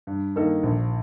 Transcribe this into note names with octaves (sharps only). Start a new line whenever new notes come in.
G2
D#3 A#3 D#4 A4
A#1